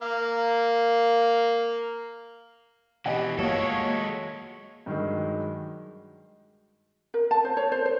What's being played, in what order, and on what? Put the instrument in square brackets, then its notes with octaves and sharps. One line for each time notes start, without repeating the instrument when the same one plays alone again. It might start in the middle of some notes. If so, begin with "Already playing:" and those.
[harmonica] A#3 F5
[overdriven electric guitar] B2 E3 [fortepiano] G4 D#5 F#5
[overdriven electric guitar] G#3 A4 [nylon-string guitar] A#3 [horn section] F4 F#4 C#5
[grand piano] G2 D#3 F#3 G#3
[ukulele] A#4
A5
C5
C#5
C5
C5